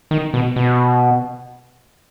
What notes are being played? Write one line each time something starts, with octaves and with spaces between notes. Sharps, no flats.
D#3
B2
B2